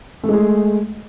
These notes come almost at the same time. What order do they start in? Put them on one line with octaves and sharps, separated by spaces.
A3 G#3 G#4